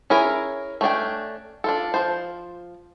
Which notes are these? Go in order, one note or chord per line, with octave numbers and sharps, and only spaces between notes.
C#4 E4 G#4 A#4
A3 C#4 D4 G5
D4 F4 A4
F3 C5